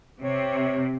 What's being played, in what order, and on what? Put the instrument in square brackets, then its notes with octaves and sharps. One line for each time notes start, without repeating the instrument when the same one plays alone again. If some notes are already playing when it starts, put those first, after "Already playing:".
[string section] C3 [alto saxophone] C#5